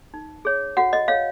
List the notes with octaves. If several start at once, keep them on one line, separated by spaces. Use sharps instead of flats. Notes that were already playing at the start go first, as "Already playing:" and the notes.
D#4
G#4 C#5
F#4 F#5
D#5
C#5 F5